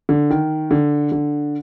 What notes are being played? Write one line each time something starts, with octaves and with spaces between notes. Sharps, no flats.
D3
D#3
D3
D3